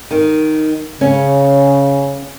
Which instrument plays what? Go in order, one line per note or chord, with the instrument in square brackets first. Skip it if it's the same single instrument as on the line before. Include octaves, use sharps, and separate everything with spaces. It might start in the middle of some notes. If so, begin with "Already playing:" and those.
[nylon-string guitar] D#3
[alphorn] C#3 [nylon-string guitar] C#4